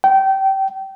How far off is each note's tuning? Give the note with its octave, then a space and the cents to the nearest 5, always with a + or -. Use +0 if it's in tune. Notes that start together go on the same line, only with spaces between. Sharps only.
G5 -25